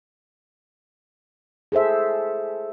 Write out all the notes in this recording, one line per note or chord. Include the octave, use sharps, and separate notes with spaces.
G#4 A4 C5 E5